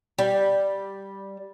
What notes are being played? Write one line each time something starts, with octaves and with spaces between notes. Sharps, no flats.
G3